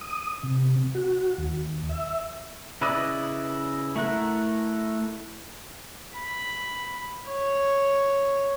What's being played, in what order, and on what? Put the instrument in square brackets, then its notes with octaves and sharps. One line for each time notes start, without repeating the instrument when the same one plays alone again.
[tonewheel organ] D#6
C3
F#4
D#2
E5
[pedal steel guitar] C#3 E4 B4 D5 D#5
A3 E4 A#4 F#5
[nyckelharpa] B5
C#5